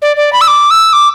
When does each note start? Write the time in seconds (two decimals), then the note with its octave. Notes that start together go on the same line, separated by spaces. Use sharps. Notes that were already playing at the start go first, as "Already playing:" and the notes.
0.02 D5
0.17 D5
0.33 B5
0.41 E6
0.48 D6
0.71 E6
0.93 D6